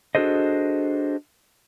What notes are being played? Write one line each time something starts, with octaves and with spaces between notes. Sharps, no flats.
D4 F#4 G#4 A4 C5 D#5